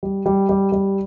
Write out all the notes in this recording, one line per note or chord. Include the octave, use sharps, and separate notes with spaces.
G3
G3
G3
G3